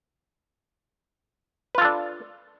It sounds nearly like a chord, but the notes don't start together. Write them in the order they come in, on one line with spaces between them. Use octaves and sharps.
B4 F4 A4 D4